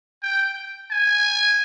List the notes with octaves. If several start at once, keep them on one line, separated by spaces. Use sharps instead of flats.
G5
G#5